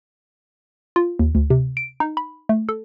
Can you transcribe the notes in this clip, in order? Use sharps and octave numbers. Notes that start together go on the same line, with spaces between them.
F4
D#2
D2
C3
D7
D#4
B5
A3
A4